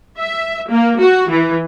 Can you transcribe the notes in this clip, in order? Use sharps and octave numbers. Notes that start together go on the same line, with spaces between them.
E5
A#3
F#4
E3